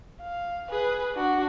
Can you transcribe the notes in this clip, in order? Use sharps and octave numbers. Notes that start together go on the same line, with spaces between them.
F5
G#4 B4
D4 F#4